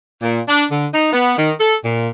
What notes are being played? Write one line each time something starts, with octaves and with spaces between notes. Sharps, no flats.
A#2
D4
D3
D#4
B3
D#3
A4
A#2